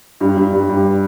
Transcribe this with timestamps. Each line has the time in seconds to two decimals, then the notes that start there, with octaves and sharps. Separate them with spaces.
0.21 G2
0.36 G2
0.52 G2
0.69 G2